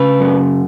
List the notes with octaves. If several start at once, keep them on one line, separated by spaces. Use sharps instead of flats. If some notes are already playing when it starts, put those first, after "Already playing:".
Already playing: C#3 B4
F#2